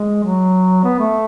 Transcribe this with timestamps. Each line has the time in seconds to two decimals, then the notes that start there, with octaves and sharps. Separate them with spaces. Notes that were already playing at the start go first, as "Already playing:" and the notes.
Already playing: G#3
0.23 F#3
0.84 B3
0.99 A3